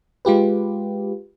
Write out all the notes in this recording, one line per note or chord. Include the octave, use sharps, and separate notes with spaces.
G#3 F4 G4 B4